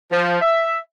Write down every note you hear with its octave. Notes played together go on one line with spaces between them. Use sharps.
F3
E5